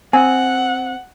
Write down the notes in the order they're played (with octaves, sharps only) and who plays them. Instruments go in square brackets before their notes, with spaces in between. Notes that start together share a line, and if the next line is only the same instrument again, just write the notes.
[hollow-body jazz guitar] C4 [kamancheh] F#5 [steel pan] G#5